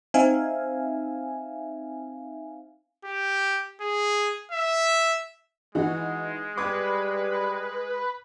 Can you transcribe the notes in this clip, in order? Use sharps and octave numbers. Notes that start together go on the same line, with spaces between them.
C4 D#4 E5 F5 G#5
G4
G#4
E5
E3 G#3 D#4 F#4
G3 B4 D6 G#6